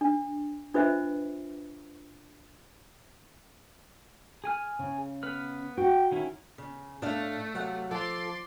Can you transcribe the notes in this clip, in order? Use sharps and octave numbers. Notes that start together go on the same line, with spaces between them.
D4
D4 F4 B4 C5 D#5 E5
G#4 G#5 F6
C#3
B3 B4 F6
F#4 G5
D#3 C#4 E4
C#3
A2 A3 D4 F5
C3 F#3 F5 F#5
F3 F4 A4 D5 C6